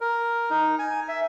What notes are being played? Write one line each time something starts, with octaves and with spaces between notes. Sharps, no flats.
A#4
D#4
G#5
E5